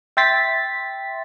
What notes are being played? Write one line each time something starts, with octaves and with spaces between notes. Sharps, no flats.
E5 G5 C6 A6 B6